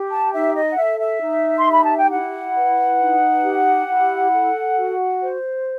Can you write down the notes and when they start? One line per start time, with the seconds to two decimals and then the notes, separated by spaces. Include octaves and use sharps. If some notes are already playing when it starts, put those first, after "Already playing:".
Already playing: G4
0.11 A5
0.33 D#4 E5
0.55 D#5
0.70 F#5
0.78 A4 E5
1.00 E5
1.22 D#4
1.58 C6
1.66 G4
1.71 B5
1.84 A5
1.98 G5
2.11 E4 F#5
2.56 B4
3.00 D#4
3.44 G4
3.88 E4
4.32 A4
4.76 F#4
5.22 C5